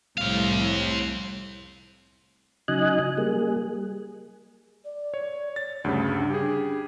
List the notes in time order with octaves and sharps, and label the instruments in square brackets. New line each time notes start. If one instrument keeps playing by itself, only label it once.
[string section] C2 A2 [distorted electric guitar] C4 F5
[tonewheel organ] C#3 F#3 D#4 D#5 G#5 F#6
G3 A#3 G#4
[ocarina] D5
[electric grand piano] C#5
[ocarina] C#5 [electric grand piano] A6
[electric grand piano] D2 G2 C#3 [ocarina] D4
[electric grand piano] G4 G#4